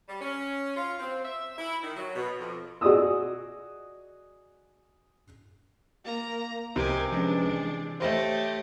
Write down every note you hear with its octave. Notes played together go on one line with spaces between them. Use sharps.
G3
C#4
F4
C4
E5
E4
D#3
F#3
B2
F2
F#4 G#4 D5 D#5 D#6 E6
A#3 A#5
C2 C3 G4 A#4 D#5 G#5
F3 G#3 C#4 D4 B4
E3
A3 G4 C5 C#5 D#5 E5